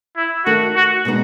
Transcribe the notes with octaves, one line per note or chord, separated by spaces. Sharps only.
E4
D#3 A3 D#4 F#4
F#4
B2 G#3 B3 D#4